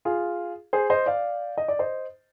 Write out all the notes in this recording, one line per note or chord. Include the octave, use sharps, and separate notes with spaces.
F4 G#4
G#4 C5
C5 D#5
D5 F5
D#5
D5
C5 D#5